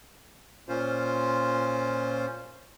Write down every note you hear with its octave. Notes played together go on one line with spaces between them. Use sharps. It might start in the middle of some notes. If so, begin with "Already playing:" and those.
A#2 C#4 F4 C5